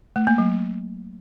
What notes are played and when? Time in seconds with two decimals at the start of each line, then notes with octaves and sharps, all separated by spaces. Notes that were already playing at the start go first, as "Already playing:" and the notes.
0.16 A3
0.27 A#3
0.38 F#3